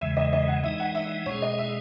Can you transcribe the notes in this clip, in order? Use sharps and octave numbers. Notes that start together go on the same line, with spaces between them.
E2 C#3 E3 G#3 E5
D#5
D#5
F#5
E3 G#3 D#4 E5
F#5
E5
B2 G#3 C#4 G#4 C#5
D#5
E5